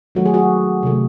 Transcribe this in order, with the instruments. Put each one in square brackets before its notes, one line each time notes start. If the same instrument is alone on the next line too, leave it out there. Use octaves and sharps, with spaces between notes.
[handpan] D#3 F#3 A3 F#4
G#4
F#4
C3 D#3 A3